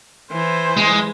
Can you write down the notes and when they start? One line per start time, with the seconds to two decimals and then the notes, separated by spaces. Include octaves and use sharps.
0.31 E3 C5
0.77 G#3